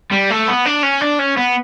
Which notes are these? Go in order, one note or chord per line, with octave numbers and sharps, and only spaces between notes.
G3
A3
B3
D4
C#4
D4
C#4
B3